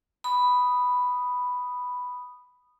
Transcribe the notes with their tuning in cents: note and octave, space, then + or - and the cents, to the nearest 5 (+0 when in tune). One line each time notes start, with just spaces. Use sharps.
B5 +0 D#6 -10